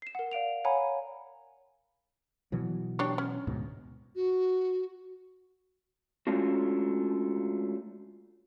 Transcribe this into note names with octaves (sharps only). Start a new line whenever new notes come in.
C7 E7
A#4 F#5
D5 F5 D7 F7
C#5 F5 F#5 G#5 A#5 B5
B2 E3 F#3
D4 G4 C#5
C#4
D2 G#2 B2
F#4
G#3 A3 C#4 D4 F4 F#4